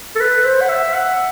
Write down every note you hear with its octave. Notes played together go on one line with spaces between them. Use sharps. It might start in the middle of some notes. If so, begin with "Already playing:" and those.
A4
B4
C5
F#5
E5
F#5